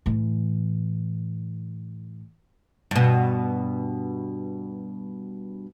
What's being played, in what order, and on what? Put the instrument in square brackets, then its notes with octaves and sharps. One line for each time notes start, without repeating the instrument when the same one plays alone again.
[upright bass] A2 E3
[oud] G2 B2